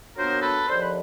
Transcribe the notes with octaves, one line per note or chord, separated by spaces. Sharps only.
A#2 F#3 B3 D4 A#4 C5
A4 B4
D#2 D3 F3 C5
B4